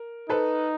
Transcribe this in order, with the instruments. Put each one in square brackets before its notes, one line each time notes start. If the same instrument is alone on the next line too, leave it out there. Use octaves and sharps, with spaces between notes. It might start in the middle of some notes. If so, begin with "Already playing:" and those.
Already playing: [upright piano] A#4
[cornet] D#4 [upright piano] A4 B4